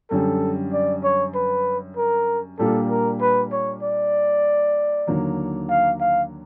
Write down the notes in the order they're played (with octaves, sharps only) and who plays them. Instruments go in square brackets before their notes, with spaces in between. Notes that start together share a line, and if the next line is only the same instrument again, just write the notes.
[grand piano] F#2 D3 G3 [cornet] A4
[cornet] D5
C#5
B4
A#4
[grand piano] A#2 G3 A#3 D4 F4 [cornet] A4
[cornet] A#4
B4
C#5
D5
[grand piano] D#2 D3 F#3 A#3
[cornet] F5
F5